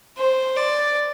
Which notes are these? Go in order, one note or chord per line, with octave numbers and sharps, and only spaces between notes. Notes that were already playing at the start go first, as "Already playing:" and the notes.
C5
D5